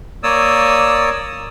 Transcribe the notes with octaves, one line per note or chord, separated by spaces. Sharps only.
A#3 C#5 D5 D#6 E6